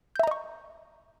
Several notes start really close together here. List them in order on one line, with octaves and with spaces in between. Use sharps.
G6 E5 A#5 D#5 C#6